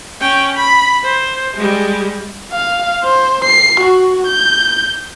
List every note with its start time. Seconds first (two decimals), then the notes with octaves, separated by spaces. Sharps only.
0.21 C#4 G5
0.57 B5
1.04 C5
1.57 G3 G#3
2.52 F5
3.04 C5
3.45 C7
3.80 F#4
4.27 G6